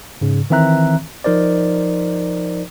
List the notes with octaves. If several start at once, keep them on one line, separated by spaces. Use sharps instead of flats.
G#2 C#3
D#3 E3 C4 E5 A#5 F#6
F3 D#4 A#4 C5 D5